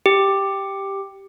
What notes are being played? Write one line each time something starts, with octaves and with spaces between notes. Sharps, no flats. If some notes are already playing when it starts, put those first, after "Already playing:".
G4